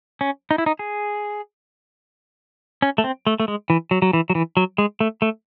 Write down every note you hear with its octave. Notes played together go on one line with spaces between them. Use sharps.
C#4
D#4
E4
D#4
G#4
C#4
A3
C4
A3
A3
G#3
E3
F#3
F#3
E3
F#3
E3
F#3
G#3
A3
A3